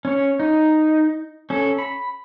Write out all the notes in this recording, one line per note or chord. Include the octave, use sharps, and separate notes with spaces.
C#4 C#5
D#4
C#4 A4
B5